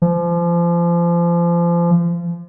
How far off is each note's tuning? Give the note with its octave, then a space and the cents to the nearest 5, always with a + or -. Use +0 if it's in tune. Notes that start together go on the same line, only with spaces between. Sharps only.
F3 -30